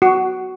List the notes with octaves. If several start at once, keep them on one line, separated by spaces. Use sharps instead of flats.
F#4